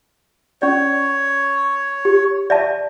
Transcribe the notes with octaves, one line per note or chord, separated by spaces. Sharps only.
C#4 C#5 D5
G4
D5 E5 A5